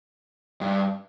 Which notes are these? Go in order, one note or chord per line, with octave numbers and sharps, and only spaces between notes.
G2